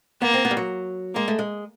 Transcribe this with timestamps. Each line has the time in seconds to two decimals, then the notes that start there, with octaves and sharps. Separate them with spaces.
0.22 A#3 B3
0.34 C4
0.45 B3
0.51 G3
0.57 F#3
1.15 G#3 A#3
1.28 A3
1.39 G#3